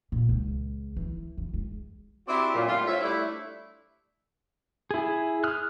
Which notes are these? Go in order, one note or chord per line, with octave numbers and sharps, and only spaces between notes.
A#2
C#2
E3
E3
G#3
C4 D4 E4 F#4 G4 D5
F#2 A#2
A2 D3 G3 F4
F4 C5 C#5 E5
G3 A3 D4 E4
E4 G#4
D#6 F6 F#6